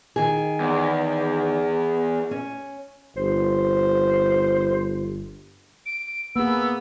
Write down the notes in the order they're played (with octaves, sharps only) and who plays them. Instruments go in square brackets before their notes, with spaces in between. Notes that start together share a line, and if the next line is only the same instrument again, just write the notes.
[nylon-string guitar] D#3 G#4
[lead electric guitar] E2
[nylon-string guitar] C#4
[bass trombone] G1 [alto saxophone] C5
[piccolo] D7
[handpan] A#3 G#4 [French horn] B3 [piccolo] E6